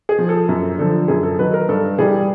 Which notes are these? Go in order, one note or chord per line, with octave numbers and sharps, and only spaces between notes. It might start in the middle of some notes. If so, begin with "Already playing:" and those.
G#4
F3
A4
F#2
D3 F3 A4
F#2 G#4
A4
D#3 F#3 B4
A#4
G2 A4
E3 G3 G#4